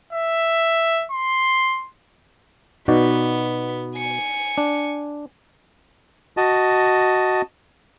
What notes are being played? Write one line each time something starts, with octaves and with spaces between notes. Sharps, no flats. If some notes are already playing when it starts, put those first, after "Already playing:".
E5
C6
B2 B3 D#4 F#4 D5
G#5 C#7
D4
F#4 D#5 A5